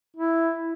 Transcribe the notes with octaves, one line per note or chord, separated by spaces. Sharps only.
E4